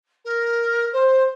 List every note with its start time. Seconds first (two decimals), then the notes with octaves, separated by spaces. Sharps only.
0.24 A#4
0.92 C5